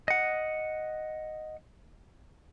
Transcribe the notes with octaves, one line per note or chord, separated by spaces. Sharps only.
D#5 F#5